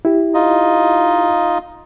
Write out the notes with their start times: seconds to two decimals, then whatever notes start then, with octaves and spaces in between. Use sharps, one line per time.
0.05 E4 G4
0.34 D#4 F4 D#5